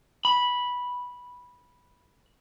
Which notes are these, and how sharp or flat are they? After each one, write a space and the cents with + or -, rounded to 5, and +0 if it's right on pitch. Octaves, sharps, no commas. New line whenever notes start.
B5 -10